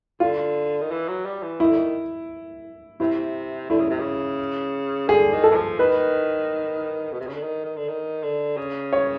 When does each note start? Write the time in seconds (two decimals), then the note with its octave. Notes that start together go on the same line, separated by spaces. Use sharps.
0.20 D3 F4
0.81 D#3
0.91 E3
1.08 F#3
1.25 G3
1.43 E3
1.60 D#3 E4
1.69 D3
1.76 D#3
3.00 C3 E4
3.70 D3 E4
3.79 C#3
3.90 C3
4.00 C#3
5.09 D3 G#4
5.33 D#3
5.44 A4
5.51 E3
5.55 F3
5.79 D#3 B4
7.13 B2
7.20 C3
7.27 C#3
7.34 D3
7.42 D#3
7.65 D#3
7.76 D3
7.88 D#3
8.23 D3
8.57 C#3
8.93 C#5